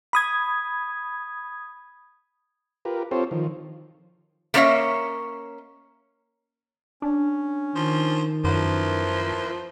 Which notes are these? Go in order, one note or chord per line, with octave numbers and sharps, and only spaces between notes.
B5 D#6 G#6
F4 G4 A#4 B4
C4 F4 G4 A4 C5 C#5
D#3 F3
A3 A#3 C#4 C#5 D#5 E5
C#4 D4
D#3 F3
F#2 F3 E4 A#4 B4